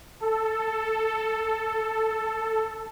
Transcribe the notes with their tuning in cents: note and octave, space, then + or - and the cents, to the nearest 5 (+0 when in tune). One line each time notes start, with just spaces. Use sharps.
A4 +5